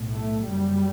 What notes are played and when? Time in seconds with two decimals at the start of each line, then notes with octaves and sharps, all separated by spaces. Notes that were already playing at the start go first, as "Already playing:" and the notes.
Already playing: B1 A2
0.13 A3
0.47 F#1 F#2 G3